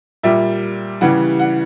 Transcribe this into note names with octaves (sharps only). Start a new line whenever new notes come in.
A#2 G3 E5
C#3 E3 G3 F#5
F#5